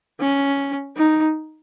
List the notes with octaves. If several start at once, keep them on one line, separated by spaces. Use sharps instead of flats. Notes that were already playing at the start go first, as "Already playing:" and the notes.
C#4
D#4